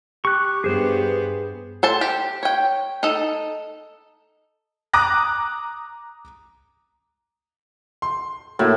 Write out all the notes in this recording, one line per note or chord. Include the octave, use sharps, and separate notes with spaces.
G4 C#6 F#6
G2 B3 G#4 C5
A4 C5 A5
G4
C#5 G5
D#4 A4
A#5 D6 D#6 F#6 A#6
C6
A2 A#3 E4 F#4